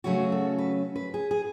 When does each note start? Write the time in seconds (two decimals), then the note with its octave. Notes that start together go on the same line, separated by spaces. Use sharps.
0.04 C#3 F#3 A3 C#4 F#4
0.32 A4
0.58 B4
0.96 B4
1.14 G#4
1.31 G#4